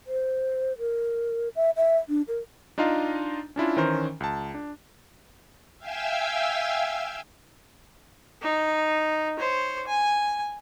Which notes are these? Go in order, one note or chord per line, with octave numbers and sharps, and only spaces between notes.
C5
A#4
E5
E5
D4
A#4
D4 D#4 F4 D#5 F5 A#5
C#4 D4 E4 F4
D#3 E3 C#4 A#4 C5
C#2 A5
D4
E5 F5 G5 G#5 E6
D#4
C5 C#5
G#5